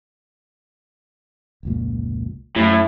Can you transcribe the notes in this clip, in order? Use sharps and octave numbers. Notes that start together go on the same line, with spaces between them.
F1 C#2 A#2
F#2 A2